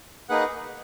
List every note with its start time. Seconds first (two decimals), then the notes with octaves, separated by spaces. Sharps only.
0.29 A#3 D#4 G#4 B4 F#5